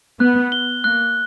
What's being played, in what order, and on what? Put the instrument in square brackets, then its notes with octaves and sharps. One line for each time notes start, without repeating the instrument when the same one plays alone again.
[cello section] B3 [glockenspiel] F#6
[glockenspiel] G7
[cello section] A#3 [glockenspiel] F#6